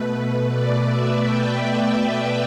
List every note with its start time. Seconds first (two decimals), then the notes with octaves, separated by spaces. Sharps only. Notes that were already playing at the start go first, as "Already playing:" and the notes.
Already playing: B2 A3 B4
0.48 D5
0.85 E5
1.22 G5
1.60 E5
1.98 D5